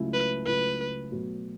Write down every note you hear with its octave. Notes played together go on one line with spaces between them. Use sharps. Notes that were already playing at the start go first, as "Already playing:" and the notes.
Already playing: C#2 C#3 F#3 A3 E4
B4
C#2 C#3 F#3 A3 E4 B4
B2 F#3 A3